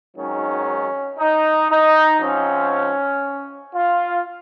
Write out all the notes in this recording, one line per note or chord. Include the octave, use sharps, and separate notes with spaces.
G#1 G#2 D#3 F#3 C#4
D#4
D#4
G#2 F3 C4 C#4
F4